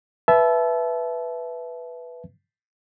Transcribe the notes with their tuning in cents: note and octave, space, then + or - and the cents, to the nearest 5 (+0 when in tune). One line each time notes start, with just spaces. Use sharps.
B4 +0 E5 +10 A5 -30